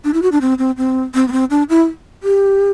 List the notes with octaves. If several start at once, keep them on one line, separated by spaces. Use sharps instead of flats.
D4
E4
F#4
D4
C4
C4
C4
C4
B3
C4
D4
E4
G4